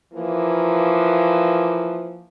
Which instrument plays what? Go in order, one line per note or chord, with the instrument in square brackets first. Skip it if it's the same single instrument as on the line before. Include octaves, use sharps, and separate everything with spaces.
[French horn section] E3 F3 A#3